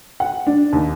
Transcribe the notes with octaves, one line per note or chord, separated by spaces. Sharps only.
F#5
D4
D#2